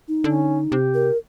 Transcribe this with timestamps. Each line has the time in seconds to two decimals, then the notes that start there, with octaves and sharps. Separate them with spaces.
0.08 D#4
0.24 D3 C#4
0.72 C3 G4
0.94 A#4